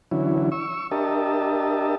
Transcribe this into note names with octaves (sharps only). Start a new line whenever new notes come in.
D3 E3 F#3 C#4 E4
C#6 E6
D4 G4 A#4 D#5 E5 A5